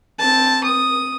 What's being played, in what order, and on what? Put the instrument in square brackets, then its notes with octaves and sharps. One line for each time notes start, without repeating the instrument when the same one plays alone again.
[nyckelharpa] C4 A5
D#6